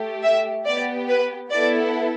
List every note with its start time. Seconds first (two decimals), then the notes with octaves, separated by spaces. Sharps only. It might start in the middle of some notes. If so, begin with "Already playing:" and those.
Already playing: A3 G4
0.23 E5
0.65 B3 G4 D5
1.08 B4
1.51 B3 E4 A4 D5